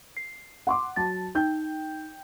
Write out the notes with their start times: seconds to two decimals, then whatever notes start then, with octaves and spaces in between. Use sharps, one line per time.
0.17 C7
0.67 F#5 C6 D6
0.96 F#3 A5 A6
1.35 D#4 G5 G6